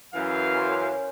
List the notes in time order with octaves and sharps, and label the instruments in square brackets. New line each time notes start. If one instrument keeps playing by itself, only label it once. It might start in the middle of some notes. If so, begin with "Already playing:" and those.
[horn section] F#2 E3 F5
[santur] C#4 A#4 C5